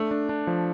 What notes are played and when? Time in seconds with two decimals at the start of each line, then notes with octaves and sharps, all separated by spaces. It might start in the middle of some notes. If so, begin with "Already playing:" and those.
Already playing: A3 D4
0.11 D4
0.29 D4
0.47 F3